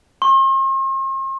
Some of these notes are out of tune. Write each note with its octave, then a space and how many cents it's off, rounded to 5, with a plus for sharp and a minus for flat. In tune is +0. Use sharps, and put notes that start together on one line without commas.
C6 +45